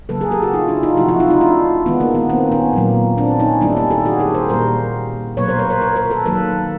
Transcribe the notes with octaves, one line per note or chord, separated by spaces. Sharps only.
C#3 F#3 A#3 A4 B4
G#4 A#4
G4 A4
F#4 G#4
D#4 F4
D4 E4
D#4 F4
C3 F3 A3 E4 F#4
E4 F#4
D#4 F4
D#4 F4
D4 E4
D#3 G#3 B3
A#3
B3
A#3 C4
B3 C#4
A#2 F#3 A#3
C4 D4
C#4 D#4
D#3 G3 A#3 D4 E4
C#4 D#4
G4 A4
F#4 G#4
G4 A4
A#4 C5
A#2 G3 A#3 A#4 C5
B2 F#3 A#3 B4 C#5
A#4 C5
B4 C#5
A#4 C5
A#4 C5
A#4 C5
A4 B4
D#3 F#3 A#3 A4 B4